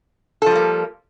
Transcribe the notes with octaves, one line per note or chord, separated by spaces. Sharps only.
F3 G3 A#3 A4